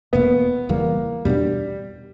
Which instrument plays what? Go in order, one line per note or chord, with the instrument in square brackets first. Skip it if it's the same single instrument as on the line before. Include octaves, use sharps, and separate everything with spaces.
[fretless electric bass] E1 E2 B2 A#3 [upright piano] B3
[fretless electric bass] E1 E2 C#3 G3 [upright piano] A#3
[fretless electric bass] E2 B2 A#3 D4 [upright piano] G3